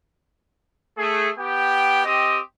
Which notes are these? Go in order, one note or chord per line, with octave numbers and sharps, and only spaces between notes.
A3 G#4
B3 G4 G5
C4 G4 D#5 D#6